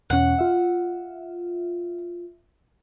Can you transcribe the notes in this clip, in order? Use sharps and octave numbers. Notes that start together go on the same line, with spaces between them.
E2 B2 C#4 F#5
F4 E5